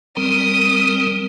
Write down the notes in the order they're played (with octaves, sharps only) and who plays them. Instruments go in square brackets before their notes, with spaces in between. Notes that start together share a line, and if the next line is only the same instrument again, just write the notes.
[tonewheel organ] G3 C4 A#4 [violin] D#6